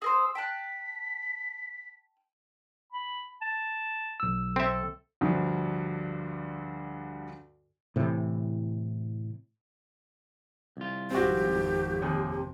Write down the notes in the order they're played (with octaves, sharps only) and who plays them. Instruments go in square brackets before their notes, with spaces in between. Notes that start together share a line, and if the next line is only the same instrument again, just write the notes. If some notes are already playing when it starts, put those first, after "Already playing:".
[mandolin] G#4 A#4 C5 [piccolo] E6
[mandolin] G5 A5 F#6 [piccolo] B6
[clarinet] B5
A5
[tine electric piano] B1 E6
[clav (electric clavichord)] C4 E5 [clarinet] A4
[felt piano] D2 G2 D3 F3
[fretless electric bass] A2 C3 E3
[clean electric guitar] C2 F4
[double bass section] G#1 F2 [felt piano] C4 F#4 [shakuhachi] G4
[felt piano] D#2 G#4 [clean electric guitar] C3